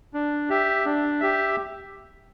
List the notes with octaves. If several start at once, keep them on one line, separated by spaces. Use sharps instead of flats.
D4
G4 E5
D4
G4 E5